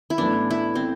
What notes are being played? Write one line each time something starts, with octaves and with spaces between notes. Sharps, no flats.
E4
A1 A2 E3 B3 D4
E4
C4